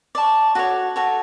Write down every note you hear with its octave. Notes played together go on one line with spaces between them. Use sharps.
D5 A5 C#6
F#4 A4 C#5
F#4 A4 C#5